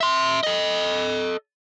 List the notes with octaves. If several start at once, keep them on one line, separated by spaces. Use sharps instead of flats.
E5 C6
A4 D#5